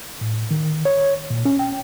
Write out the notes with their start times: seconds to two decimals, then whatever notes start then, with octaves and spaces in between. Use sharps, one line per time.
0.21 A2
0.51 D#3
0.85 C#5
1.30 A#2
1.45 C#4
1.59 G5